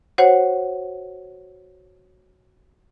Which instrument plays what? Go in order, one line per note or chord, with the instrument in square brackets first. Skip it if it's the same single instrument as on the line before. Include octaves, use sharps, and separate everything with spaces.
[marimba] F#4 C5 C#5 F#5